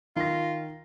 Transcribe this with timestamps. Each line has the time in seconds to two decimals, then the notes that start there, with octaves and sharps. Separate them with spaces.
0.16 D#3 F4 A#6